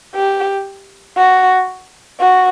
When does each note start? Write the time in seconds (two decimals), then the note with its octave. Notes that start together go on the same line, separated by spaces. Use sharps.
0.15 G4
1.17 F#4
2.20 F#4